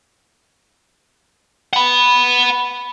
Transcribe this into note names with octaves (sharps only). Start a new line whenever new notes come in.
F#5 B5